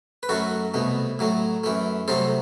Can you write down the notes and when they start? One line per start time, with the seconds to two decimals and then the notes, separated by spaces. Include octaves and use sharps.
0.23 B4
0.29 F#2 F#3 A3 F#4 A4
0.74 C2 B2 A3
1.19 A2 F#3 A3
1.64 F#2 E3 A3
2.08 C2 C3 F#3 A3 A4 C5